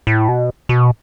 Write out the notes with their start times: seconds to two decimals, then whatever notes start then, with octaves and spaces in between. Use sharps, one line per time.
0.07 A2
0.28 B2
0.69 B2